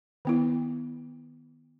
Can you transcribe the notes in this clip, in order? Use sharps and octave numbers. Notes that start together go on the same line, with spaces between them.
D#3 B3 E4